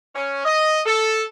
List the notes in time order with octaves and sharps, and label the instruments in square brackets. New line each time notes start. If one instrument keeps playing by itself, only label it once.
[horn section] C#4
D#5
A4